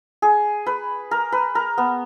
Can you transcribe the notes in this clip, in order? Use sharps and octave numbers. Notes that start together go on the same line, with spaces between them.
G#4
B4
A#4
B4
A#4
B3